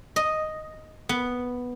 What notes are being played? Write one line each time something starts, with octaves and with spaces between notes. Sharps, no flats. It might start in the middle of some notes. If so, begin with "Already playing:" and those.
D#5
B3